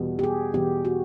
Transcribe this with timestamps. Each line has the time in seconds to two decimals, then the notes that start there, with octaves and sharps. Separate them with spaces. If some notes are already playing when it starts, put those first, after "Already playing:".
Already playing: E2 B2 G3
0.19 G4
0.23 G#4
0.53 E2 B2 G3 G4
0.85 F#4